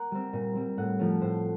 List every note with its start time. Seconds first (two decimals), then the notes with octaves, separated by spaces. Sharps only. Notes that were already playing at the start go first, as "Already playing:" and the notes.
Already playing: A#3 F#5
0.11 G3 C4
0.33 A#2
0.55 G3 C4
0.77 A2 F#5
0.99 F3 A3 C#4
1.21 A2 C5